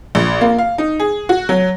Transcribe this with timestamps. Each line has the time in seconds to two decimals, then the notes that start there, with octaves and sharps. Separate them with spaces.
0.15 A#1
0.41 A#3
0.58 F5
0.78 D#4
1.00 G#4
1.29 F#4
1.49 F#3